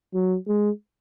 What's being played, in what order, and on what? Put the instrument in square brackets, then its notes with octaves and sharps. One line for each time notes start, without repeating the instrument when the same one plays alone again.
[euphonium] F#3
G#3